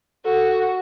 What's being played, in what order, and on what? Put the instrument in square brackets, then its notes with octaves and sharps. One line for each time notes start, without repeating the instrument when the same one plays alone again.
[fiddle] F#4 [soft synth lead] A4